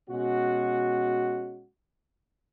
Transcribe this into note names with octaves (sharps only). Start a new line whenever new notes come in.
B2 G#3 C#4 F#4